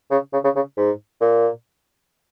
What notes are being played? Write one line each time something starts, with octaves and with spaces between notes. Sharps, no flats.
C#3
C#3
C#3
C#3
G#2
A#2